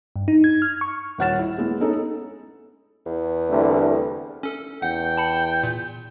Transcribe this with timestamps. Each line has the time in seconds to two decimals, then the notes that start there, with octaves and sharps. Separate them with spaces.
0.16 G2
0.28 D#4
0.44 G#6
0.62 F6
0.81 C#6
1.18 D#1 C#5 F#5 F6 A6 E7
1.39 E4
1.58 G#3 B3 E4
1.80 B3 C#4 D#4 G#4 A4
3.06 E2
3.50 C2 D3 A3
4.43 C#4 A4
4.82 E2 F#5 G5
5.17 A5 B5 C#7
5.63 A#2